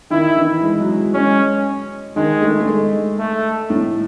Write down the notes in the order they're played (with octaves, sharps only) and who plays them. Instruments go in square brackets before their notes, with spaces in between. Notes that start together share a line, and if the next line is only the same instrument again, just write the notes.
[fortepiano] D#3 [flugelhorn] E4
[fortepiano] E3
G#3
F#3
G#3
[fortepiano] G#3 [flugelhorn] C#4
[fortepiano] D#3 [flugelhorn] G#3
[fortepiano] A3
A3
G#3
[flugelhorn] A3
[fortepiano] A2